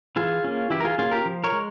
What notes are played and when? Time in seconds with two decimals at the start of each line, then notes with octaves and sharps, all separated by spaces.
0.16 E3 F4 G#4
0.44 A#3 C#4
0.70 E3 E4 G4
0.80 A#4
0.85 F4 G#4
0.98 A#3 C#4 F4 G#4
1.11 G4 A#4
1.25 F3
1.44 A#4 C#5
1.52 G#3